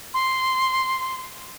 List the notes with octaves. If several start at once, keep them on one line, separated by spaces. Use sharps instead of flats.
C6